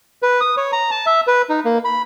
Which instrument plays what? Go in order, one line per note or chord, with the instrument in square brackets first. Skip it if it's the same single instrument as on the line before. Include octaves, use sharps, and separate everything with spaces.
[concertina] B4
D#6
C#5
A#5
A5
E5
B4
D#4
A#3
B5